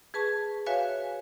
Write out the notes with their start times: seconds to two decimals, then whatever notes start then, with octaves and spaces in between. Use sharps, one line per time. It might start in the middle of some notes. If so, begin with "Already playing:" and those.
0.14 G#4 B4 A5 C#6
0.66 F#4 B4 C#5 E5 F5 G#5